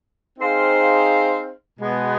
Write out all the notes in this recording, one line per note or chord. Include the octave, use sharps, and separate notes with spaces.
C4 D#4 G#4 C5 F5
B2 G#3 B3